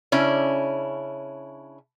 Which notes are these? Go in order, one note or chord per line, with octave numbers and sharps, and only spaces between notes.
C#3 C#4 D4 E4